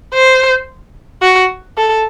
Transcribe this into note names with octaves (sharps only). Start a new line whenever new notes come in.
C5
F#4
A4